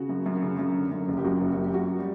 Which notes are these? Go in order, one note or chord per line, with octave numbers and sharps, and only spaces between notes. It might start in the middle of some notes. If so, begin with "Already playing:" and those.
Already playing: C#3 F#4
F#2
F#2
C#3
F#2
D3
F#2
F#1
G4
F#2 F#4
F#1
G4
F#2
G4
F#2 F#4
G3